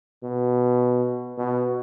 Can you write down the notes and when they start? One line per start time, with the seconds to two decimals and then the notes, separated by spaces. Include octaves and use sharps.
0.23 B2
1.38 B2